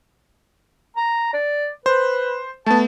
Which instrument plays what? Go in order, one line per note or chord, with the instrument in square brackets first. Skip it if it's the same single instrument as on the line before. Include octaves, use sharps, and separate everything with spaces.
[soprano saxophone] A#5
D5
[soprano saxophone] B4 [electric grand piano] C5
[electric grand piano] A3 B3 [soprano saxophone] A5